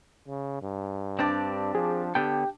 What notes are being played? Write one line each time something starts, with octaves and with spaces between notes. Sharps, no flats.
C#3
G2
C4 D4 G4 D5 A5 D6
F3 G#4
D3 B3 G4 A4 G5